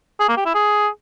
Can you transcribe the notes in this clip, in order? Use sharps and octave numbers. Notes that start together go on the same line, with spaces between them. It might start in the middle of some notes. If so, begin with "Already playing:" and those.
G#4
A#3
G4
E4
G#4